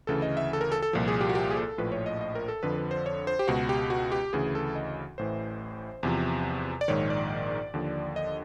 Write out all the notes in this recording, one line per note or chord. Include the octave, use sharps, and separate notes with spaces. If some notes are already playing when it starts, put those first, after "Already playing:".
D2 C#3 E3 A4
D#5
E5
A4
A#4
A4
A4
C2 A#2 F3
G#4
G4
F#4
G4
G#4
A4
A#1 A2 F3 B4
C#5
D#5
D#5
A#4
A4
F2 D3 F3 B4
B4
C5
C#5
C5
G4
C#2 B2 F#4
G4
F#4
G4
D2 C#3 E3 G#4
A4
D#5
A1 A2 E3 C5
E2 C3 F3
D5
A#1 G#2 D#3 C#5
D5
D#2 D3 F3
D#5